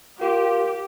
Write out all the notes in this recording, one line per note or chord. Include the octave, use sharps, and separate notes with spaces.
F4 G4 A#4